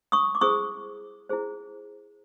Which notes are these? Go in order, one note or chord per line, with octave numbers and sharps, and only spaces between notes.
C#6 D#6
D6
E4 G#4 C5 C#6 D#6
E4 G#4 C5